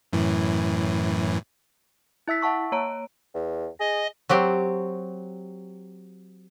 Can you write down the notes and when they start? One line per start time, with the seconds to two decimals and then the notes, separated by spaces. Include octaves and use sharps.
0.13 F#2 A2 E3
2.28 E4 E5 E6 B6
2.41 E5 F#5 A5 C#6 E6
2.72 A#3 C#5 A#5 D7
3.34 E2
3.80 G#4 D#5
4.29 F#3 C4 G4